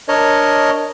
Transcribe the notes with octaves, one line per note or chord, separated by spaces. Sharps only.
D4 A#4 C#5 D#5